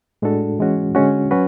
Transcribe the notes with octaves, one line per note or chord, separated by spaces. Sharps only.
A2 G#3 D4 F#4 A4
E3 G#3 C#4 F#4
D3 G#3 C#4 F#4
F#3 C#4 F#4 B4